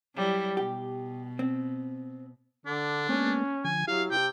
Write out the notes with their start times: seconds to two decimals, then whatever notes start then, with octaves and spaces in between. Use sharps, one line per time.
0.15 F#3 G3 E4
0.57 B2 G4
1.39 C4
2.66 D3 D4
3.09 G#3 A#3 B3 C#4
3.65 D3 F3 G#5
3.88 F#3 E4 G4 F5
4.11 C3 G5